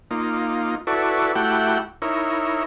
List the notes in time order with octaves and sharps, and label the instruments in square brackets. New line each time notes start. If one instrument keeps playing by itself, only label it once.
[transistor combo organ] A#3 D#4 F4
E4 F#4 A4 B4 D5 C#6
A3 E4 F#4 G4 F#5 G5
D#4 E4 A#4 C#5